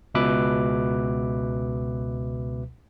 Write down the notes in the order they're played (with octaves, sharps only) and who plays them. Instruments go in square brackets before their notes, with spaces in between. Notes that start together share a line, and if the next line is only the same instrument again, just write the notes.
[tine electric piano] C#2 B2 B4 E5 D6 F#6